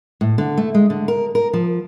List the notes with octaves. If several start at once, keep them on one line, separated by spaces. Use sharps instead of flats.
A2
D3
A3
G#3
D3
A#4
A#4
F3